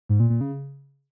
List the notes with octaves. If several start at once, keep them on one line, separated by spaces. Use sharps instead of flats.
G#2
A#2
A#2
C#3